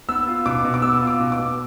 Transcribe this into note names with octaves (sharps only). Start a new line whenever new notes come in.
B3 E6
F4
B2 D6
B2
D6
B3 E6
F4
D6
B2
D6
B2